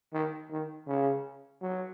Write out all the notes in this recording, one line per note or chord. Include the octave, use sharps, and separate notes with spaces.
D#3
D#3
C#3
F#3